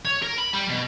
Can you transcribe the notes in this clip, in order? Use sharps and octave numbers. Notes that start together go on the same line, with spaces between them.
C#5
A#4
B5
G3
B2